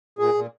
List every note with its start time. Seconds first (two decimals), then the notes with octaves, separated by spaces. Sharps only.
0.19 A#2 G#4
0.34 A#2